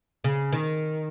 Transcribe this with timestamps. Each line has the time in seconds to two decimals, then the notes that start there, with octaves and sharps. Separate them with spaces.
0.24 C#3
0.53 D#3